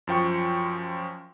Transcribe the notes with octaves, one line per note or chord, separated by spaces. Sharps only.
F#2 F3 G5 C#6